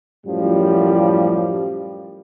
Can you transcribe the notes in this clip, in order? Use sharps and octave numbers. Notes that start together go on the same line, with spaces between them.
F#2 A2 F3 G3